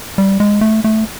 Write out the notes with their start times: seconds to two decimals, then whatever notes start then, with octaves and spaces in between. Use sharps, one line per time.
0.18 G3
0.40 G#3
0.61 A3
0.84 A3